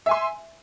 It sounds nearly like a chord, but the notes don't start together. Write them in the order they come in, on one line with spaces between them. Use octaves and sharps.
E5 G#5 C6